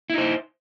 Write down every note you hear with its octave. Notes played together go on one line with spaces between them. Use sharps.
D#4 E4 C5